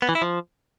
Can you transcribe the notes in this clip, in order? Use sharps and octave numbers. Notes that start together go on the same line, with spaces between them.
B3
E3
E4
F3